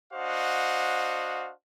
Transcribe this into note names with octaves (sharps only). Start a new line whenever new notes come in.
D4 F#4 C5 D#5 F5 F#5